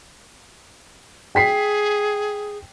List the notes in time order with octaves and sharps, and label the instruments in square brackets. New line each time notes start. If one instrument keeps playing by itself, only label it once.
[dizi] G#4 [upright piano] G5 B6 C7